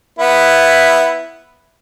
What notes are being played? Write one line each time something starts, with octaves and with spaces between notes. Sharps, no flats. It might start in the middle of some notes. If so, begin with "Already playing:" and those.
B3 E4